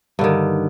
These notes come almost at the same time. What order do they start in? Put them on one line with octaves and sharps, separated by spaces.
G2 D3 D#3